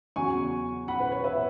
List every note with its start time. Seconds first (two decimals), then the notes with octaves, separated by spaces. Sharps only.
0.16 E2 C#3 F#3 G#5 C#6
0.88 F#5 B5
1.00 B4
1.12 C#5
1.24 B4 E5